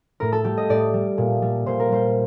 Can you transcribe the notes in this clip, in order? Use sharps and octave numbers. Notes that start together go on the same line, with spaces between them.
A2 A#4
A4
G3 G4
D#5
A2 D5
G3
A#2
G3
A#2 C5
A#4
G3 C5